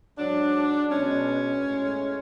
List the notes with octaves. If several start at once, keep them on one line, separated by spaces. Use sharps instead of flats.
G#2 F#3 D4
B2 G#3 C#4
A2 G#3